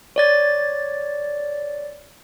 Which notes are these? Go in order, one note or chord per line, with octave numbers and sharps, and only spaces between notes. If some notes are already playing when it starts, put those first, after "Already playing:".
C#5 D5 A6